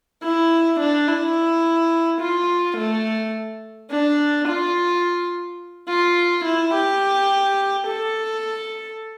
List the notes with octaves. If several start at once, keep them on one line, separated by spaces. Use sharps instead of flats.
E4
D4
E4
F4
A3
D4
F4
F4
E4
G4
A4